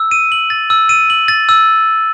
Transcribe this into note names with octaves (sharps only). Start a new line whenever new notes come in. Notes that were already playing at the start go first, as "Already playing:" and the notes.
Already playing: E6
D#7
F#7
A6
E6
D#7
F#7
A6
E6